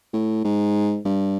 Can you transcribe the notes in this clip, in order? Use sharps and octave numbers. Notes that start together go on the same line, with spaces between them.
A2
G#2
G2